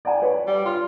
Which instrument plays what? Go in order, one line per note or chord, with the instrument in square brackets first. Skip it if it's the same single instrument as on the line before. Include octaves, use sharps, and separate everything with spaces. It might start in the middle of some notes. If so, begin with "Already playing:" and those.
[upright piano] D5 F#5 G#5
B4 C#5 D5
[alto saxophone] G3
[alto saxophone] F4 [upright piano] C6